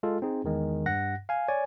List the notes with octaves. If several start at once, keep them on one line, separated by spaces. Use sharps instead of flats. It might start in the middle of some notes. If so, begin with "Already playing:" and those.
G#3 F4 A4
C4 D#4 G#4
E2 D#3 G#3
G2 F#5 F#6 A#6
F5 G#5
C#5 D5 G#5